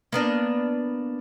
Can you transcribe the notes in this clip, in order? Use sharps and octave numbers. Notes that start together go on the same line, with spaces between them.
A#3 B3 D4